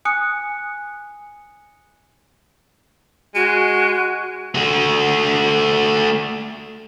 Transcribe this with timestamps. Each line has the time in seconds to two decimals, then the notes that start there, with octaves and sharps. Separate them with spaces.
0.05 G#5 D#6 F#6 C#7
3.35 G#3 F#4
4.55 A3 F#4